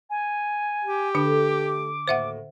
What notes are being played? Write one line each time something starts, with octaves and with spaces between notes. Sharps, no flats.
G#5
G4
D3 A3 D4 A4
D6
D#2 A2 F#4 C5 E5 F#5